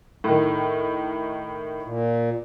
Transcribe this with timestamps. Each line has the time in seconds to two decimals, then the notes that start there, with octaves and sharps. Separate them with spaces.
0.24 A2 D#3
1.83 A#2